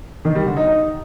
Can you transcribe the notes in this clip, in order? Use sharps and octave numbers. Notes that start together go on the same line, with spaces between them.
D#3
G3
D3
D#4
D#4